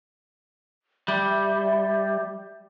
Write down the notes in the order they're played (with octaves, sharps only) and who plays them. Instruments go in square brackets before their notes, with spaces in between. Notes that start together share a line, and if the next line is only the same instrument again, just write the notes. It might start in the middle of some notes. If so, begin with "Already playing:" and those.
[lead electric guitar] G3 [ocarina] E5